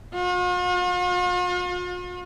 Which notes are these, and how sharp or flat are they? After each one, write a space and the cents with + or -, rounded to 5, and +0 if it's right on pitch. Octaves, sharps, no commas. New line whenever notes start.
F4 +45